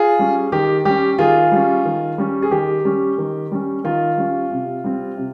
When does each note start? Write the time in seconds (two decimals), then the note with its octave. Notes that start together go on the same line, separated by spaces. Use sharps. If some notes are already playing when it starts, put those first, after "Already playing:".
Already playing: F4 G#4
0.19 G3 C#4
0.52 D#3 G4
0.85 G3 C#4 G4
1.18 D#3 F4 G#4
1.52 G3 C#4
1.85 D#3
2.18 G3 C#4
2.42 G#4
2.51 D#3 G4
2.85 G3 C#4
3.18 D#3
3.51 G3 C#4
3.84 D#3 F4
4.17 G3 C#4
4.51 C3
4.84 G3 C4
5.17 C3